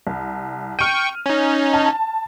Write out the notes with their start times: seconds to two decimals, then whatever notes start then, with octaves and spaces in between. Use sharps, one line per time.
0.07 C2
0.79 G5 C#6 F6 D#7
1.26 C#4 D#4
1.74 A5